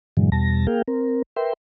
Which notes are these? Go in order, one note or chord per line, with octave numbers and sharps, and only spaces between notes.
G2 A#2 D3 E3 F#3 G#3
E2 B2 G3 A5 A#6
A#3 G#4 A#4 F5 G5
C4 A#4
A#4 B4 E5 G5 C6